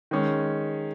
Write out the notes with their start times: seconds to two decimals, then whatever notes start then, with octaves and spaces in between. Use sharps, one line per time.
0.11 D#3 G#3 C#4